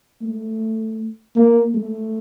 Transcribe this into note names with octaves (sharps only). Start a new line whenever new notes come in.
A3
A#3
A3